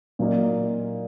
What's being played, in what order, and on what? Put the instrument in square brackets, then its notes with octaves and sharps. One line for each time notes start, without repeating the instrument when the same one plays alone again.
[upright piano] A#2 F#3 A#3 D#4